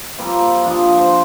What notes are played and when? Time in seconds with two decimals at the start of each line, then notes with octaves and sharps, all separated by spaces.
0.18 F3 G3 A#3 C4
0.65 F3 D4 D#5
0.99 C5